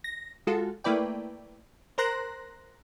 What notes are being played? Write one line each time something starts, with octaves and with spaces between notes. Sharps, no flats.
A#6
G#3 F4 F#4 A4
A3 A#3 E4 B4 D5 G5
A#4 C5 A#5 C6 F#6 A#6